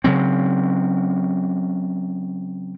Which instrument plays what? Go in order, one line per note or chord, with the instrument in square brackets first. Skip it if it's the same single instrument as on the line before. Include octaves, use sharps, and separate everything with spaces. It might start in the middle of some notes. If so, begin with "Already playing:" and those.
[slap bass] C#3 F#3 C4